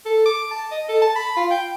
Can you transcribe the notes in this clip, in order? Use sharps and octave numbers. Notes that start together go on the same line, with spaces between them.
A4
D6
A5
D#5
A4
A5
B5
F4
G5